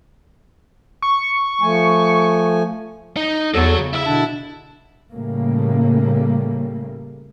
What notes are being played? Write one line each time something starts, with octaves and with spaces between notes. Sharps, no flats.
C#6
F3 A3 G#5
D#4
E2 F#3 A4 C#5
C#3
E4 E5
B2 D3 D4
A2 C#3 G3 A3 A#3